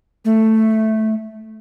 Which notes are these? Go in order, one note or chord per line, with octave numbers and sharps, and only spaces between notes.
A3